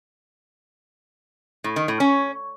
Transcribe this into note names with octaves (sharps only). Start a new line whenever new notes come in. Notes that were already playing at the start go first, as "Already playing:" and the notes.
A2
D#3
A2
C#4